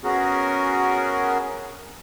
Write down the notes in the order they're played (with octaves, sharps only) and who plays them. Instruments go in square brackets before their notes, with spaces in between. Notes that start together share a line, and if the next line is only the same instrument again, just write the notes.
[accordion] B3 C#4 F#4 G#4 A#4